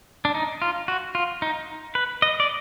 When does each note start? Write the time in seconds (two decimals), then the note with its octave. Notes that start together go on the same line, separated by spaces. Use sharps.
0.25 D4
0.34 D#4
0.62 F4
0.88 F#4
1.15 F4
1.42 D#4
1.95 B4
2.22 D#5
2.40 D5